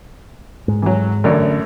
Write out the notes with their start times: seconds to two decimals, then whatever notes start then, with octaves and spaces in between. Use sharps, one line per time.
0.68 G#2
0.82 E3 F#3
1.24 A1 F#2 D3 D5